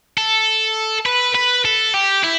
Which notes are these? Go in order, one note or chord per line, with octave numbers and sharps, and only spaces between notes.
A4
B4
B4
A4
G4
E4